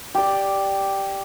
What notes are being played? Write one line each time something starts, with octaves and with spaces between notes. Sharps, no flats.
G4 D5